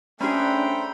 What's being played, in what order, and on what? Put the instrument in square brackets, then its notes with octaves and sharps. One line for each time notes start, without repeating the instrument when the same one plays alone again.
[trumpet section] A3 G5 [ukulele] C#4 G#4 [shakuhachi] D4 [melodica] C5 A#5 B5